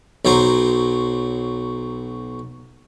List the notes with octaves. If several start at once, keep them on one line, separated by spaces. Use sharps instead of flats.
B1 F#3 C5 A#5